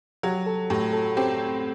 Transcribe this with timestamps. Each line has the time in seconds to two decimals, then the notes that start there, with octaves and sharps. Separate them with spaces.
0.23 F#3 G4
0.46 A4
0.70 A2 G4
0.93 A4
1.17 C4 G4